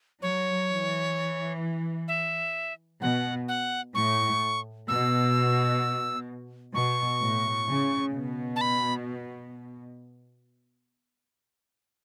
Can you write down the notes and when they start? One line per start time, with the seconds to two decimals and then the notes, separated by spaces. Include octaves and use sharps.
0.22 F#3 C#5
0.69 E3
2.08 E5
3.02 B2 F#5
3.48 F#5
3.95 A2 C#6
4.88 B2 E6
6.74 B2 C#6
7.21 A2
7.68 C#3
8.14 B2
8.56 A5
8.61 B5